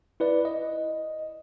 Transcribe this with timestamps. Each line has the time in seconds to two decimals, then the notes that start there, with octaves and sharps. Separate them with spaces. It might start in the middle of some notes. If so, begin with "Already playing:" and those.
0.20 E4 B4 D5
0.45 D#5